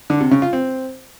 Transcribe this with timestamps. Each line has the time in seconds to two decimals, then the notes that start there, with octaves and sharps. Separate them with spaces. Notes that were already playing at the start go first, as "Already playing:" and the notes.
0.10 D3
0.21 C3
0.31 C#3
0.42 F4
0.53 C4